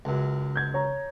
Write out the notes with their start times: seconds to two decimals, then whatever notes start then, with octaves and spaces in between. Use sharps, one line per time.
0.05 C#2 F#2
0.56 G6 G#6
0.74 C#5 A#5